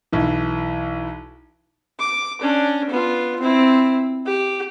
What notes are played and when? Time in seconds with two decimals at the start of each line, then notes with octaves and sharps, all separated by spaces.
0.12 B1 E3
2.00 D6
2.41 C#4 D4
2.90 B3 F4
3.40 C4 E4
4.26 G4